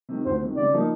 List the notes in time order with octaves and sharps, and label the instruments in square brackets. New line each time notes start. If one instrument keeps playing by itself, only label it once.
[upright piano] C3 D#3
[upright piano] D2 [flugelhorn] C5
[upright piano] C3 D#3
[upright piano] C#3 [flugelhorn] D5
[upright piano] F3 A#3 D#4